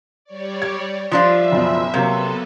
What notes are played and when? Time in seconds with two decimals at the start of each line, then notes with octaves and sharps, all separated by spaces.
0.25 G3 C#5 D5
0.62 G#6
1.11 F3 D4 F4 E5
1.52 F#1 B2
1.94 C3 F#3 A#3 B3 A4